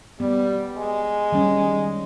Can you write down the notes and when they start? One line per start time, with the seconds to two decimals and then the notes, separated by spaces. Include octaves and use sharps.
0.20 G3 B3
0.77 G#3
1.32 D#3 G3 C#4